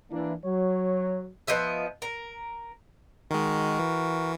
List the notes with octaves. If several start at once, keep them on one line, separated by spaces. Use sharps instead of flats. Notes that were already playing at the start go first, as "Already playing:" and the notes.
E3 A#3 D4
F#3 C#5
F3 B3 D#5 E5
A#4
D#3 G#3 F#4 A#4
E3